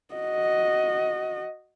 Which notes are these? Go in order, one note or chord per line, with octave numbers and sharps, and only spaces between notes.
F#4 D#5